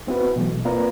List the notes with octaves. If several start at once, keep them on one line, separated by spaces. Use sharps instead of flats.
B3 C4 E4 F#4 B4
B2 E3 F#3 A3
A#3 C4 F4 B4 D5 A#5